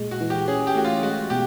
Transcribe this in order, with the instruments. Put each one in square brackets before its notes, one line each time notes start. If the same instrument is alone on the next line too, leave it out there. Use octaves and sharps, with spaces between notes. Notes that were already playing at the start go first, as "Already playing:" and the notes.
Already playing: [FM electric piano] A#2 G#3
[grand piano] F#4
[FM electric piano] E3
[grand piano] G4
[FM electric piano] C#4 [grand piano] G#4
[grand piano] G4
[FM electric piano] A3 [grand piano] F#4
[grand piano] F4
[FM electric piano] G#3 [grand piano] F#4
[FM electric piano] B2 [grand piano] G4